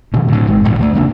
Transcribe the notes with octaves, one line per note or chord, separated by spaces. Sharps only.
B2 D3 D#3
A2 D3
G#1 G#2 G#3
A#1 G#2
D3 G#3 A3
C2 C#3 A#3 D4